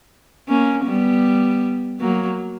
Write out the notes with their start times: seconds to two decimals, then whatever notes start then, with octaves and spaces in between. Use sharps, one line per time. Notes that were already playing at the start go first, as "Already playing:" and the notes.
0.48 A#3 C#4
0.86 G3 B3
2.00 F#3 A#3